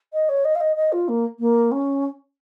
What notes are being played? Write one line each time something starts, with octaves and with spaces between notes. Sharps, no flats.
D#5
C#5
D#5
F5
D#5
D#5
F4
A#3
A#3
C#4